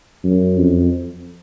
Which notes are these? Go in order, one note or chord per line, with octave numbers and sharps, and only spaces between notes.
F#2
F2